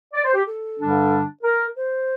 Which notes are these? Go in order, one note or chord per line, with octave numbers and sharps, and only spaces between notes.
D5
C5
G4
A4
G2 D3 G3 D4
A#4
C5